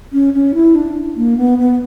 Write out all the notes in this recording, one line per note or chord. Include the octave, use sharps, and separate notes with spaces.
C#4
C#4
E4
D4
A#3
B3
B3